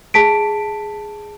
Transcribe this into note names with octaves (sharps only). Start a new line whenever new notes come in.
G#4 A5 B6 D7